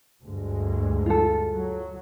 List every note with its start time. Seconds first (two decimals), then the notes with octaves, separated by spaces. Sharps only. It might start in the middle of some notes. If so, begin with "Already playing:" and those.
0.21 D2 G2 G#3
1.06 F4 A4
1.52 F#3